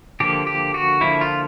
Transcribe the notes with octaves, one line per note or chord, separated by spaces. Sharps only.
D3 F3 A#3 G4
G4
F#4
D3 F3 A#3 E4
F4